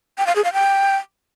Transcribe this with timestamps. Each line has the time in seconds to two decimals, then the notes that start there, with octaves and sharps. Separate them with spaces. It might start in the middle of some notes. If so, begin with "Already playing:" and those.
0.18 G5
0.27 F5
0.36 G#4
0.44 F5
0.53 G5